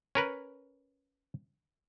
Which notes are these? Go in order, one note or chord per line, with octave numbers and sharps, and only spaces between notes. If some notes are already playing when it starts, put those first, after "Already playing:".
C#4 A#4 B4